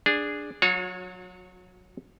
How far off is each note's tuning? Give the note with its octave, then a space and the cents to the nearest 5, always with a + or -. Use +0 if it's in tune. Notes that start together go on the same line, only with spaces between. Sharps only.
D4 +0 G#4 -10
F#3 -20 F#4 -45 C#5 +0